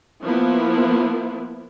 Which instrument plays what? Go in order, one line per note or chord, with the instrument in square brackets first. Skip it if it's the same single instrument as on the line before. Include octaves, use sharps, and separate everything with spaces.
[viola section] F3 A#3 B3 E4